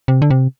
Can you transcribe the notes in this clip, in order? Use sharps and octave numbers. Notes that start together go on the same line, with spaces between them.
C3
D3
C3